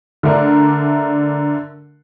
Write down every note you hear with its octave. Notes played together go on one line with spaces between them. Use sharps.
D3 A3 D4 A#4